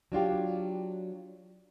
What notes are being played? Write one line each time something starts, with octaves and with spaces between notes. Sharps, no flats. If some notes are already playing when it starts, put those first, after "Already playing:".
F#3 D4 F4 G4